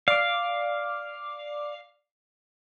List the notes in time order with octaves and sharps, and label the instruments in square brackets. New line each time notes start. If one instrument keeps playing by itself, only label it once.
[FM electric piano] D5 D6 [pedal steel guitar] F5